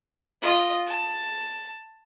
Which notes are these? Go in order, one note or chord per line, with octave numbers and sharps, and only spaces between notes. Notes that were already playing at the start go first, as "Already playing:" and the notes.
F4 D#5
A5